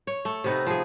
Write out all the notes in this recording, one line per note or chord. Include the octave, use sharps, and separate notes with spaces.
C#5
A3
C3 B3 D#4
F3 G#4